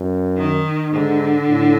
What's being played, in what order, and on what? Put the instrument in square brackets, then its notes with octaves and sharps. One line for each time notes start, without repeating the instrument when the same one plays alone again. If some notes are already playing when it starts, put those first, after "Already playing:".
Already playing: [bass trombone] F#2
[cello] D#3
[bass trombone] G#2 [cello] D3
[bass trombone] A2